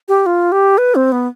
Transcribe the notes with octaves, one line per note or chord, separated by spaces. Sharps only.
G4
F4
G4
B4
C4
B3